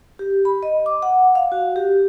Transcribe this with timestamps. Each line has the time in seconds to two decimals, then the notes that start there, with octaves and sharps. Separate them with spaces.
0.19 G4
0.45 B5
0.63 D#5
0.86 D6
1.02 F#5
1.35 F5
1.52 F#4
1.76 G4